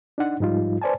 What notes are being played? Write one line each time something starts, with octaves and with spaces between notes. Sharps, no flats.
D4 D#4 F#5
G#2 F3 G3 D#4 F4
B4 C5 D5 G#5 A5